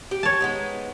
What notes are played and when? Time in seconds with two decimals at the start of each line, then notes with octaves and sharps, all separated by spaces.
0.11 G4
0.23 C#5 A5
0.41 G#3 B3 D#4